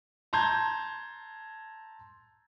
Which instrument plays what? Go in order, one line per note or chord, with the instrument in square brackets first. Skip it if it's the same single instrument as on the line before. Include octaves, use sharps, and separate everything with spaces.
[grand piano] A5 A#5 C6 G6 G#6